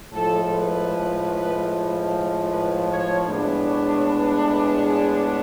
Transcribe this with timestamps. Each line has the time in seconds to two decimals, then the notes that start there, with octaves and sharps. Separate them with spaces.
0.12 A2 F3 G#3 A4
0.52 B4
2.49 B4
2.89 C#5
3.28 A2 G#3 B3 D4
3.67 C#5
4.06 B4
4.85 G#4